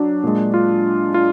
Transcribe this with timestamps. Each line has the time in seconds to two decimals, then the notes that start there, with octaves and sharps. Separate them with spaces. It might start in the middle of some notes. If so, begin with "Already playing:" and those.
Already playing: F#3 D4
0.23 A#2 G#3
0.54 F4
1.14 F4